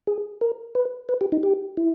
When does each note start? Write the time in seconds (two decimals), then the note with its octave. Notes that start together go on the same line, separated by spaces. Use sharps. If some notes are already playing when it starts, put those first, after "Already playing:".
0.07 G#4
0.41 A#4
0.75 B4
1.09 B4
1.21 G4
1.32 D#4
1.43 G4
1.77 E4